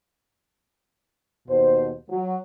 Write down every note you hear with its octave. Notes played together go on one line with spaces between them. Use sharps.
D#2 B2 C5
F#3